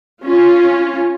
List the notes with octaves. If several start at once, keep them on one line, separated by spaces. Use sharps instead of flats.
C#4 F4